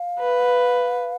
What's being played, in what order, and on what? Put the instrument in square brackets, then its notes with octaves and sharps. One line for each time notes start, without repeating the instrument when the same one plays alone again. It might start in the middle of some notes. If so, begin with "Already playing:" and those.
Already playing: [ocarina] F5
[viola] B4